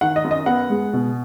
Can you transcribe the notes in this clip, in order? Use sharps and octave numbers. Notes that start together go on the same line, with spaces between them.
D#3 F#5
D#5
F#2
D#5
B3 F#5
G#3
B2